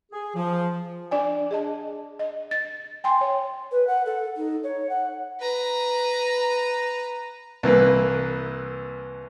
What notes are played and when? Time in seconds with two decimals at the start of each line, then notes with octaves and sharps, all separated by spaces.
0.12 G#4
0.35 F3
1.11 D4 D5 G#5
1.51 G#4 D#5 A5
2.19 D#5
2.51 A6
3.04 G5 G#5 C6
3.21 C#5
3.72 B4
3.87 F#5
4.06 A4
4.36 D#4
4.63 C#5
4.89 F#5
5.40 B4 A#5
7.63 C2 E3 A#3 B4